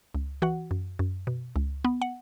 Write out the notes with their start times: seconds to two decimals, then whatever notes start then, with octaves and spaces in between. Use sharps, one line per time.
0.15 C#2
0.42 E3 F#4 F#5
0.71 F#2
0.99 F#2
1.27 B2
1.56 C#2
1.85 B3
2.02 F#5